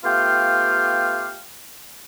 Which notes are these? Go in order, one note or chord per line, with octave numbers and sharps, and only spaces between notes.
A3 B3 F4 G4 F5 G5